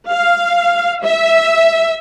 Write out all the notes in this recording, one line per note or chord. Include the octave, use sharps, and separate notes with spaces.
F5
E5